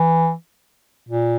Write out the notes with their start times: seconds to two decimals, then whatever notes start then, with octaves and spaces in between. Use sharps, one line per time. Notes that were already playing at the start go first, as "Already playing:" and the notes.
Already playing: E3
1.09 A#2